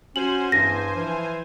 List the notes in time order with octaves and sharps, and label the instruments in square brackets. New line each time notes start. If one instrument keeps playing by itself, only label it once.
[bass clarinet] C#4 [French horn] F#4 [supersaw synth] C5 G#5 [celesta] F#7
[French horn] E2 [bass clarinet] G2 [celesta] A#6
[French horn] E3 [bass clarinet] F3